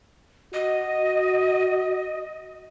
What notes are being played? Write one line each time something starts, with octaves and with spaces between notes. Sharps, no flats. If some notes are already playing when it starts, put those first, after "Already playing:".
F#4 D#5